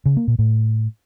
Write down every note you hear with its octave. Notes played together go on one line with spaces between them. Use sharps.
C#3
A#3
A#2
A2